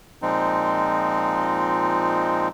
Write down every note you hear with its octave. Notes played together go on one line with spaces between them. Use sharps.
A#2 F3 G#3 C4 D#4